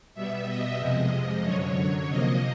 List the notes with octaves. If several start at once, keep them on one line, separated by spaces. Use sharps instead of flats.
B2 G3 B3 E5
D#5
F2 C3 F3 G#3 D#5
F#2 D3 F#3 C#5
C#5
C3 F3 A#3 D#5